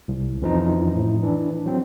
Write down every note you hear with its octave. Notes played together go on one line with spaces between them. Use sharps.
C2
F2 E3 F3 C#4 D#4
A2
E3 D4
F#3 C4